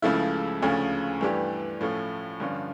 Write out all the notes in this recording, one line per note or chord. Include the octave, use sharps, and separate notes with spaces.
C#2 C#3 F3 A3 E4
D2 C#3 F3 A3 C#4
G2 E3 A3 D4 G4
A2 F3 A3 C#4
G2 D3 F3 C#4